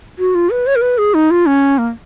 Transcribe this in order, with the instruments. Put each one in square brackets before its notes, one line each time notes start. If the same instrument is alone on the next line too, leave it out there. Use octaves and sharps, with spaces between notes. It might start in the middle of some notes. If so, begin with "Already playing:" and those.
[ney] F#4
F4
B4
C#5
A#4
B4
G#4
D#4
F4
C#4
A#3